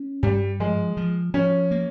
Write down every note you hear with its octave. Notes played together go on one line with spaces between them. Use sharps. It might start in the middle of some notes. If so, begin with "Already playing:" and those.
Already playing: C#4
G2 G3
F3 G#3
F3
F3 C#4
A#3